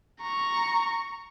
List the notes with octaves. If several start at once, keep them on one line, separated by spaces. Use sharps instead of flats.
A#5 C#6